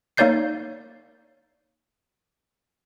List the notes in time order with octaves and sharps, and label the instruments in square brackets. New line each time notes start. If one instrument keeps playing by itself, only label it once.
[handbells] A#3 D#4 C#5 D5 G6 C7